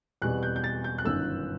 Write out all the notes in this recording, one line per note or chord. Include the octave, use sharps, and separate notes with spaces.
E2 B2 G3 C4 F#6
G6
G6
A6
G6
F#6
G1 F#2 D#3 E6